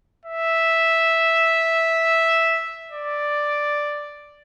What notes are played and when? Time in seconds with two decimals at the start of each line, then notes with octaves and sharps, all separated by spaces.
0.25 E5
2.91 D5